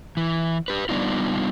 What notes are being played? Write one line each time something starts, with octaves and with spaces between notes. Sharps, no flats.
E3
G4 B4
G3 B3 D4 D#4 F4